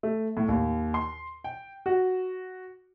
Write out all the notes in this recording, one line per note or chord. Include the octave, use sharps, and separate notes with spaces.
A3
A2
D#2
C6
G5
F#4